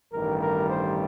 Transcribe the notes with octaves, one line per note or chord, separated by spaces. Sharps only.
A1 G2 D#3 G3 A#4
A#4
C5